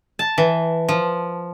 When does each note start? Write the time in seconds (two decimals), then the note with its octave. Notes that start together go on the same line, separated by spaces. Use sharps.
0.19 A5
0.38 E3
0.89 F3